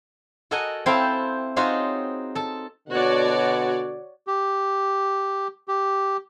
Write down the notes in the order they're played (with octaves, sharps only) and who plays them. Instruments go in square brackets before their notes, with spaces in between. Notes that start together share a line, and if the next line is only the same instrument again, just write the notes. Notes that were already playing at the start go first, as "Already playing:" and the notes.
[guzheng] F#4 A4 A#4 D#5 F#5 G#5
C4 E4 A4 C5 F5 G5
C4 D#4 F4 F#4 G#4 C#5
A4 A5
[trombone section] B2 D3 [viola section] F#4 C#5 D5
[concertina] G4
G4